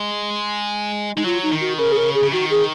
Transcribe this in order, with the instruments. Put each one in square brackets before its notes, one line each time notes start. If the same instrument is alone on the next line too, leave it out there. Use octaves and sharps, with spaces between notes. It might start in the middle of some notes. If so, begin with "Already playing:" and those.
Already playing: [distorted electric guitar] G#3
[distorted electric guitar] G#3 [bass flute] D#4
[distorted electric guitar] F#3 [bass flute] F4
[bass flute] D#4
[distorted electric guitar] D#3
[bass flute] F#4
[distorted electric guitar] C#3 [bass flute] A#4
[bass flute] G#4
A#4
G#4
[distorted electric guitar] C#3
[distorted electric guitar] D#3 [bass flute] F#4
[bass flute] G#4